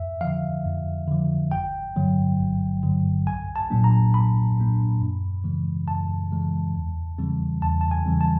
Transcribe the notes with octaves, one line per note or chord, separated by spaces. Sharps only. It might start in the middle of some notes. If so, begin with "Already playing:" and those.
Already playing: F2 E5
D3 F3 F5
F2
D3 F3
G1 G5
G2 D3 F#3
G1
G2 D3 F#3
B1 G#5
A5
A#2 F#3 A#3 D4
A#5
B1 B5
A#2 F#3 A#3 D4
F#2
C#3 E3 G#3
F#2 A5
C#3 E3 G#3
E2
C#3 E3 G3 C4
E2 A5
A5
G#5
C#3 E3 G3 C4
A5